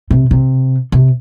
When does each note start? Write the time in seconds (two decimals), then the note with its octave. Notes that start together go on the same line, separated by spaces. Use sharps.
0.10 C3
0.31 C3
0.92 C3